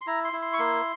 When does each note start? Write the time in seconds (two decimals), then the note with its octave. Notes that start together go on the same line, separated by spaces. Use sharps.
0.01 C6
0.07 E4 A#5
0.24 C6
0.33 E4
0.42 C6
0.53 C#6
0.59 A#3 C6